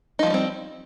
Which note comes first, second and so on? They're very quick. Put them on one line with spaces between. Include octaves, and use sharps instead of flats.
D#4 F3 G#3 G3 C4